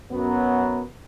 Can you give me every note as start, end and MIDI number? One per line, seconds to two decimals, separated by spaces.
0.12 0.83 42
0.12 0.83 54
0.12 0.83 59